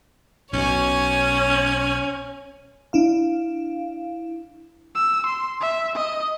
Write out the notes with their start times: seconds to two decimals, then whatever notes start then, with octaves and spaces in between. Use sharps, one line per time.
0.53 B1 B2 C#4 C#5 G#5
2.93 D4 E4 F5
4.95 E6
5.26 C6
5.61 E5
5.96 D#5